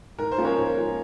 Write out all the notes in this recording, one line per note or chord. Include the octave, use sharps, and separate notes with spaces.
G#2 A#4
C5
F3 A#3 C#4
A#4 C#5
G#2
F3 A#3 C#4